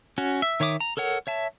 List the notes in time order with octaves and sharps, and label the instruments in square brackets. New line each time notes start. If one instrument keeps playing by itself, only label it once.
[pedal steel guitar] C#4 F#4
E5
D#3 C#5 E5 D6 D#6
A#5
A4 A#4 C#5 F#5
C#5 E5 A5